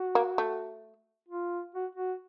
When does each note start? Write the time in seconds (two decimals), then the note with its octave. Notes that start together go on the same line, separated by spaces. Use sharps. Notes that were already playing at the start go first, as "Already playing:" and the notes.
Already playing: F#4
0.15 A#3
0.38 A3
1.29 F4
1.75 F#4
1.95 F#4